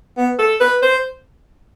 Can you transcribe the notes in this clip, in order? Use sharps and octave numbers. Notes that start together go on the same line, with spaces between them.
B3
A4
B4
C5